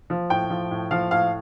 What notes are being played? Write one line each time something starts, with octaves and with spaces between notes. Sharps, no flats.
F3
A2 G5
F3
A2
F3 F5
A2 F5